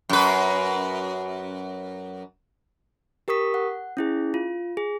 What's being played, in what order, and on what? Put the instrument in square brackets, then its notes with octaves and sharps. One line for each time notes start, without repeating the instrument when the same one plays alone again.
[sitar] F#2 B4
[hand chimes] G4 A#4 C#6 D#6 B6
F#5
C#4 E4 G#4
F4
G#4